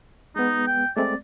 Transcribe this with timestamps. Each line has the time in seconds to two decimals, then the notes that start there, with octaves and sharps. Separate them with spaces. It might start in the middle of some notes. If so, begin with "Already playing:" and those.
0.36 G#3 B3 D#4
0.67 G5
0.97 G#3 A3 C4 D5